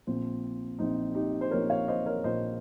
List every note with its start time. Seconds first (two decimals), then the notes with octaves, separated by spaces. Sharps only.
0.07 A#1 A#2 F3 C4
0.79 A#1 A#2 F3 C4 D#4
1.15 D#4 G4
1.41 C5
1.51 A#1 A#2 F3 A#4 C#5
1.70 C#5 F5
1.88 C5 D#5
2.06 A#4 C#5
2.24 A#1 A#2 F3 C5 D#5